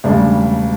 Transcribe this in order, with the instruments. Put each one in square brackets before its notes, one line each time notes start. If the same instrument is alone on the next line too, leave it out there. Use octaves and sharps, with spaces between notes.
[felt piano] E1 D2 C#3 G3 D4